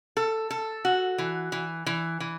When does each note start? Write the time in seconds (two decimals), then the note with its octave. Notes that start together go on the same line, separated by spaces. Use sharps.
0.17 A4
0.51 A4
0.85 F#4
1.18 E3
1.52 E3
1.86 E3
2.20 E3